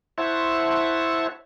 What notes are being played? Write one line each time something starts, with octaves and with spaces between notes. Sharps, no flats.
E4 C5 C#5 E5 F#5 A5